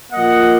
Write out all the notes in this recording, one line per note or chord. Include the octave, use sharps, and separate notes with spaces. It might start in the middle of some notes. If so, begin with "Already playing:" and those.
A#2 F3 A#3 D#5 F#5